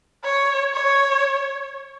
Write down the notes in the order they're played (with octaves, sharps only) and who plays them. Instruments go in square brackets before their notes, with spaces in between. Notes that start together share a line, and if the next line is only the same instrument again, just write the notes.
[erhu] C#5
C#5